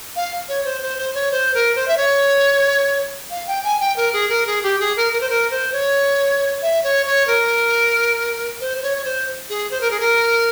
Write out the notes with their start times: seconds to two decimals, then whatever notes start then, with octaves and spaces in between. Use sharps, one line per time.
0.16 F5
0.49 C#5
0.65 C5
0.82 C5
0.98 C5
1.14 C#5
1.31 C5
1.54 A#4
1.76 C5
1.88 E5
1.97 C#5
3.31 F5
3.47 G5
3.64 G#5
3.80 G5
3.96 A#4
4.13 G#4
4.29 A#4
4.47 G#4
4.63 G4
4.80 G#4
4.97 A#4
5.13 A#4
5.21 C5
5.30 A#4
5.51 C5
5.73 C#5
6.62 E5
6.84 C#5
7.06 C#5
7.27 A#4
8.61 C5
8.78 C5
8.83 C#5
8.98 C#5
9.05 C5
9.49 G#4
9.71 C5
9.81 A#4
9.91 G#4
10.00 A#4